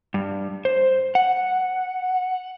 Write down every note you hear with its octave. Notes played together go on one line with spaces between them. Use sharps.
G2
C5
F#5